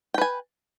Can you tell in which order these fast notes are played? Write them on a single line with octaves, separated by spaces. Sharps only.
G5 B4 G#5